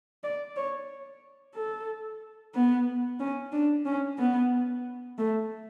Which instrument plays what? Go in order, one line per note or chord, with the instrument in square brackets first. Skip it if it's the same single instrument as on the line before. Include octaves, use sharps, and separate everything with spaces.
[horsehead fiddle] D5
C#5
A4
B3
C#4
D4
C#4
B3
A3